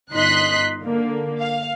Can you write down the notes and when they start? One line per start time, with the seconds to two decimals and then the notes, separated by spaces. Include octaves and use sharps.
0.13 G1 D#4 D#5 C6 F#6 B6
0.81 D3 A#3
1.40 F5